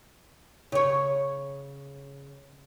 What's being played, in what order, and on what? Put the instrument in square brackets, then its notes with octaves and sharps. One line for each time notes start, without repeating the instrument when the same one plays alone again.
[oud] C#3 C#5